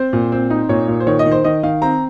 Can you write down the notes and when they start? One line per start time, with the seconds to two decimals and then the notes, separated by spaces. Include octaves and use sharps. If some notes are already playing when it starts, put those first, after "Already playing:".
Already playing: C4 C5
0.13 A#2
0.32 C4
0.50 D#4
0.69 A#2 C#5
0.88 A#2
1.00 C5
1.07 D#3 C#5
1.19 D#5
1.26 D#3
1.32 C5
1.44 D#3 D#5
1.63 D#3 F5
1.82 C4 A#5